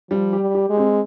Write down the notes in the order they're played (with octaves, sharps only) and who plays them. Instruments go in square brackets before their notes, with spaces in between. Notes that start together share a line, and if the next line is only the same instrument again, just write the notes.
[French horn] F3 [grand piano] G3
[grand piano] G4
[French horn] G3
[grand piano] G4
[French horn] G#3
[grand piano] C4